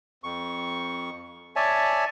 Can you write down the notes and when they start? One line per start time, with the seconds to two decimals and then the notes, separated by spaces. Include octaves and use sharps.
0.24 F2 C#6
1.56 C#5 D5 E5 G#5 A5